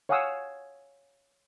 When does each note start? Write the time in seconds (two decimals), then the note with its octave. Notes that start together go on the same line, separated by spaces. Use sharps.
0.09 C#5 F5 F#5 G#5 D#6 E6